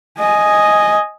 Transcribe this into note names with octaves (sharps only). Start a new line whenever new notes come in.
D#5 G#5